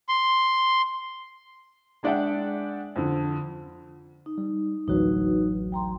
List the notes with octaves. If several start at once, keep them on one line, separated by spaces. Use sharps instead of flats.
C6
G#3 D4 D5 E5 F#5 G5
F2 D3
D#4
G3
A1 D2 F#3 D#4 F#4 B4
G5 A#5 C6